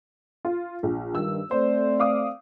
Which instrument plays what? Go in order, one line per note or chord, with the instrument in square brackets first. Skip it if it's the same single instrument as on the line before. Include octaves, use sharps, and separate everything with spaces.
[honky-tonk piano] F4
A#1
[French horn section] G2 D#3 [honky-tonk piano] E6
[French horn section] A3 C4 D5 [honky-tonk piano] C5
[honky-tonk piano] F5 D6 D#6